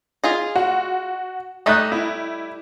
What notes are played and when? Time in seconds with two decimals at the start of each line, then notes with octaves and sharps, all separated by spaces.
0.24 F4 G#4 D#5
0.56 F#4
1.66 G3 A3 D#4 D#5 D#6 F#6
1.92 E4